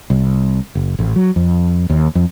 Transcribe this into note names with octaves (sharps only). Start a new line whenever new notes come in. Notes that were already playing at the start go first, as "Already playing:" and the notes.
C2
F#1
A1
F#3
F2
D#2
F2